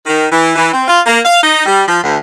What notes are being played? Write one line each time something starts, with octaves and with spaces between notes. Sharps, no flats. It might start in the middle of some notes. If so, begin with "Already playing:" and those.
D#3
E3
E3
C4
F4
A#3
F5
D#4
G3
F3
D2